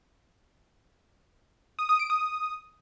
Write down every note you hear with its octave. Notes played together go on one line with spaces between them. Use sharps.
D#6
D#6
D7
D#6